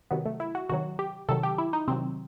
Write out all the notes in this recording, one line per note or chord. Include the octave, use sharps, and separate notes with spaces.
C3 D#3 F#3 B3
A3
E4
F#4
C3 D#3 F#3 F#4
G4
C3 D#3 F#3 A4
G4
E4
D#4
C3 D#3 F#3 C4